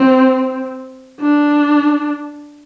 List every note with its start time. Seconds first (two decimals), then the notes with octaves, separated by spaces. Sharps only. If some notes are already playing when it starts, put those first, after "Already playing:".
Already playing: C4
1.20 D4